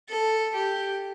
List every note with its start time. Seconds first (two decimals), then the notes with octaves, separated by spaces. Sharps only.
0.09 A4
0.55 G4